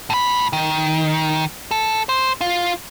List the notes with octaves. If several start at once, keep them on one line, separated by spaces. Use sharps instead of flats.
A2 B5
D#3
A4
C5
F4